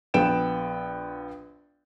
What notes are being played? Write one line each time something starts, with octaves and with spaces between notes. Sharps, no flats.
A#1 B3 G5 D7 E7